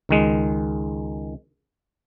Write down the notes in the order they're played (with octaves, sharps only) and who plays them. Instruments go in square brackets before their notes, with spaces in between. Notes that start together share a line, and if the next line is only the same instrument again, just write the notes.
[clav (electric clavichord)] C#2 D#3 G#3